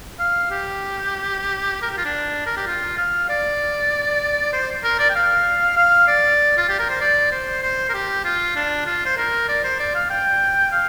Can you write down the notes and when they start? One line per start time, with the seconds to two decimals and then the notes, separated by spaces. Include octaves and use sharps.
0.19 F5
0.51 G4
1.82 A#4
1.90 G4
1.97 F4
2.05 D4
2.46 A#4
2.57 G4
2.67 F4
2.98 F5
3.29 D5
4.53 C5
4.84 A#4
4.99 D5
5.10 G5
5.15 F5
5.77 F5
6.07 D5
6.57 F4
6.69 G4
6.79 A#4
6.89 C5
7.00 D5
7.32 C5
7.62 C5
7.89 A#4
7.94 G4
8.24 F4
8.55 D4
8.86 F4
9.05 C5
9.17 A#4
9.48 D5
9.64 C5
9.79 D5
9.95 F5
10.10 G5
10.72 F5